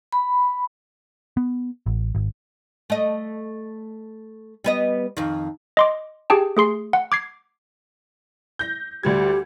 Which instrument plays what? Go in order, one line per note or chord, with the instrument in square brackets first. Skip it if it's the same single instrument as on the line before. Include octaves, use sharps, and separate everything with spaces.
[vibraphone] B5
[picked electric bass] B3
A1
G#1
[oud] A3 D#5
G3 B3 D#5
F2 D#3
[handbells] D#5 C6 D6
G4 G#4 G5 A5
A3 G#4 C6 C7
F#5
D6 G#6 C7
[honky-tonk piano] G6 A#6
[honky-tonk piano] D2 G3 G#6 [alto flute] G4